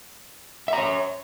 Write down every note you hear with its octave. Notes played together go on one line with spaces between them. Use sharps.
C#5 E5 A#5